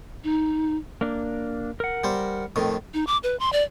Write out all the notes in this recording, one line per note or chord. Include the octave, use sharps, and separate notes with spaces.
D#4
A#3 D4
A#4 F#5
G3 C5
F2 A2 D#3
D#4
D6
B4
C6
D5